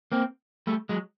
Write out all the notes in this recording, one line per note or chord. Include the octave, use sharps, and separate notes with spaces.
A#3 C4
G3 A3
F#3 G#3